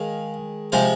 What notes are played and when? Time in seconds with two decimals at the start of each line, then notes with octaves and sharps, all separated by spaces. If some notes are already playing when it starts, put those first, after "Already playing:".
Already playing: D#3 G#3 F5
0.72 C3 F3 G#3 C5